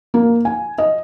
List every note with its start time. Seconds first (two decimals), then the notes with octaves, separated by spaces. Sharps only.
0.14 A#3
0.45 G#5
0.78 D#5